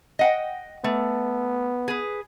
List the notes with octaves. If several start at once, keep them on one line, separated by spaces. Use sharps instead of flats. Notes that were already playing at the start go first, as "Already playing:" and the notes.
D#5 F#5 G5
A3 B3
G#4 B4